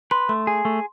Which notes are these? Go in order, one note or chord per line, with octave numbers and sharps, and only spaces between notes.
B4 C6
A3 C6
G#4
A3